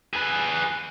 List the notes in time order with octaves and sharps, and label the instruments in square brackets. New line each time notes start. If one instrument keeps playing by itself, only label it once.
[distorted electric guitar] G#4 B4